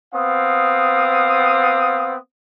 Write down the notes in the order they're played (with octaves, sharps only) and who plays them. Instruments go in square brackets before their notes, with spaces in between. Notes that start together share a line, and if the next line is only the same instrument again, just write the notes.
[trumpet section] B3 C4 F5 D#6